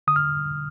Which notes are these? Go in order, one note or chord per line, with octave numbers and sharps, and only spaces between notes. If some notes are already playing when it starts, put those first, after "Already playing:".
D3 D#6
F6